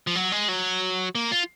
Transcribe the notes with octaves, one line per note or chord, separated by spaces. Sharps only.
F3
F#3
G#3
F#3
A#3
F4